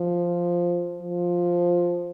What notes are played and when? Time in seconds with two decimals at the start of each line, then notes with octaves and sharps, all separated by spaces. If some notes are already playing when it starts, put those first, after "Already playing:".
Already playing: F3
1.02 F3